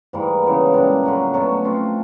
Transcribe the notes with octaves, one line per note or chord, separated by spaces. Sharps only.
G#2 E3 G3 A#3
C#3 E3 G#3 B3
A#2 G3 A#3 D4
D3 F#3 A#3
B2 F#3 A3 C#4
F3 A3 C4 F4